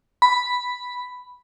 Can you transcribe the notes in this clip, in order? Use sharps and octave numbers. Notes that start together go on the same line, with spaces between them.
B5